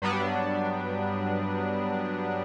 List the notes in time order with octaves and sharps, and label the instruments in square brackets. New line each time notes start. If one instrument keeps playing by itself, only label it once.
[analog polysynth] G2 F#3 G3 B3 D4